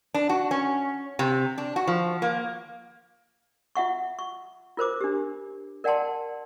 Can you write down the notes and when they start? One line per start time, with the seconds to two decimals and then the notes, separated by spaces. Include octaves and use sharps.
0.14 D4
0.29 F#4
0.51 C#4
1.19 C3
1.58 D4
1.76 F#4
1.87 F3
2.22 A#3
3.75 F4 E5 F#5 C#6
4.19 C#6
4.77 F4 A#4 C5 D6
5.01 D4 G4
5.84 A#4 D5 F#5 G5 A5 C6